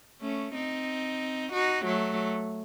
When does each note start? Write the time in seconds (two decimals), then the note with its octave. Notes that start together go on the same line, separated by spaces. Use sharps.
0.21 A3 C#4
0.54 C4 D#4
1.53 D#4 F#4
1.85 F#3 A3